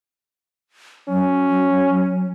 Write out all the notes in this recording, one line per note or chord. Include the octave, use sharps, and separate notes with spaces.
F#3 C#4